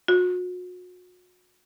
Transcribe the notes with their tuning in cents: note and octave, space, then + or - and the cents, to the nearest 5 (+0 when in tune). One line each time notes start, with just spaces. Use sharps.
F#4 -40